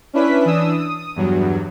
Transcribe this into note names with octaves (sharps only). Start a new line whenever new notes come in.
C#4 D4 E4 B4 B6
E3 D4 D#6 E6
D#6
E2 G2 F#3